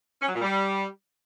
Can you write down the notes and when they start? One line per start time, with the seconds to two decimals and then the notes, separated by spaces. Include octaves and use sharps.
0.21 C#4
0.28 F#3
0.35 A#2
0.42 G3